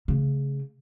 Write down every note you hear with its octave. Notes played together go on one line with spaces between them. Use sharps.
C#3 A3